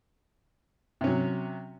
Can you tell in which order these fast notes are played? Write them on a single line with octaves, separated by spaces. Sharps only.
C3 C#4 F#3